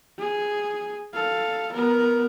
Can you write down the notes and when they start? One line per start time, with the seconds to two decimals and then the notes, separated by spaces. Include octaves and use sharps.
0.18 G#4
1.14 A4 F5
1.73 B3 A#4